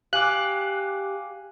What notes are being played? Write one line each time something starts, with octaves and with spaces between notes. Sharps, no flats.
G4 F5 G#5 D6 F#6